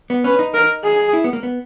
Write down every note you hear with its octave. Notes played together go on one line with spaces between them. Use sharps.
B3
C#4 B4
D#4
A#4
G#4
E4
B3
A#3
B3